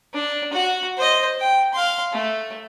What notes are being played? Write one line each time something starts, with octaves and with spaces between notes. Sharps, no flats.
D4
F#4 F#5
C5 D#5
G5
F5 C6
A3